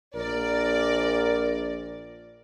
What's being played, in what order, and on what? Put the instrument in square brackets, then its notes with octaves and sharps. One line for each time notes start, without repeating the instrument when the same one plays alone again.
[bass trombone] A#1 [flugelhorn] A#4 [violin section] D5